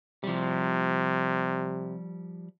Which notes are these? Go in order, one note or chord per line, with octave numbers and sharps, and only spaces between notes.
C3 F3 G3